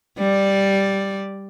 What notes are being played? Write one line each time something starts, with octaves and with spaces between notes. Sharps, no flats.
G3 D5